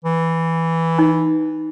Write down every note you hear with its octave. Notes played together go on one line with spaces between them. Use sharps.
E3
D#4